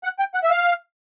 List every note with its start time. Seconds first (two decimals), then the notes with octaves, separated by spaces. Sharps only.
0.04 F#5
0.19 G5
0.34 F#5
0.43 E5
0.50 F5